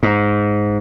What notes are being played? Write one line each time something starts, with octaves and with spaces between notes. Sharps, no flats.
G#2